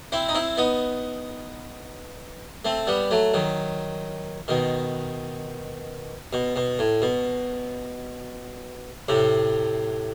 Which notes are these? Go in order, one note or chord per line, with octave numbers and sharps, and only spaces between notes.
C4 E4
D#4
C4 E4
B3 D#4
A3 C4
G3 B3
F#3 A3
D#3 F#3
B2 D#3
B2
B2
A2
B2
A2 C3